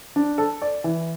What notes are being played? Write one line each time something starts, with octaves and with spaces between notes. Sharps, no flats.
D4
A4
D5
E3